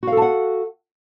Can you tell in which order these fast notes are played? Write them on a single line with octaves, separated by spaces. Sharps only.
F#4 F5 A4 A5 F#5